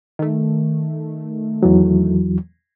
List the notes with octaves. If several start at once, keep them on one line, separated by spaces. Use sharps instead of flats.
D#3 A3
E2 E3 F#3